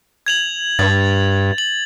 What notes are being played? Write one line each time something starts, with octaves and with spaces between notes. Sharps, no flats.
G#6 F7 F#7
G2 A6
F#7